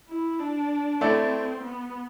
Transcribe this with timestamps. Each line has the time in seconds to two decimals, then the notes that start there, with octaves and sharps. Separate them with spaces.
0.09 E4
0.39 D4
1.01 A3 C4 E4 A4 D5
1.63 B3